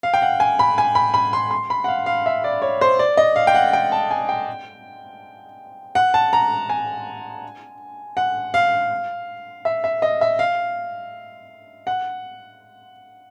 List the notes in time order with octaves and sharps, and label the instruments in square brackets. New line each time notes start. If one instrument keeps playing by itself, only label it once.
[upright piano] F5
G5
F#5
G#5
B5
G#5
B5
B5
C6
C6
B5
F#5
F5
F5
E5
D5
C#5
C5
D5
D#5
F5
G5
F#5
G5
A5
G#5
G5
F#5
A5
A#5
G#5
F#5
F5
E5
E5
D#5
E5
F5
F#5